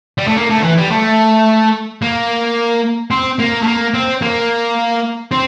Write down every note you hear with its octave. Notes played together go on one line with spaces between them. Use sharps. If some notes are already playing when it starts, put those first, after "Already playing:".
G3
A3
A#3
A3
D3
E3
G3
A3
A#3
C4
A#3
A3
A#3
C4
A#3
C4